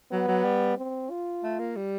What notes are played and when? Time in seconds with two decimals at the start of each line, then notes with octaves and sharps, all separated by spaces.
0.12 F#3 B3
0.28 F#3
0.44 G3
0.77 C4
1.10 F4
1.43 A3
1.59 A#3
1.76 G3